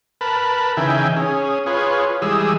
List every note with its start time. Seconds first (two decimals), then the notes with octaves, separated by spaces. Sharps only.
0.21 A#4 B4 A5 B5
0.77 C#3 E3 D#4 E5 G5 G#5
1.16 C#4 G#4
1.66 F4 G#4 B4 C#5
2.22 E3 G3 G#3 G#4 D#6 E6